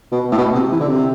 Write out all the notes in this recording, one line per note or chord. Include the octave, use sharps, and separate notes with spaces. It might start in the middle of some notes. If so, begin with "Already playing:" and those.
B2
A2
B2
C3
E3
D3
C3